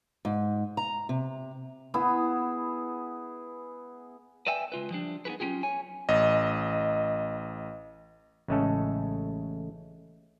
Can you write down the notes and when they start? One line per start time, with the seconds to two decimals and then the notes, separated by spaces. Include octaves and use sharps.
0.25 G#2
0.77 A#5
1.09 C3
1.94 B3 E4 G#4
4.47 B4 D5 E5 G5 G#5
4.72 C#2 F4 B4
4.90 F3 G3 D4
5.25 B3 D#4 G4 G#4 B4
5.40 F#3 C#4 D4 F4 G4 G#4
5.63 C#5 G#5
6.09 A1 D#5
8.48 A1 C#3 G#3 A3 C#4 A4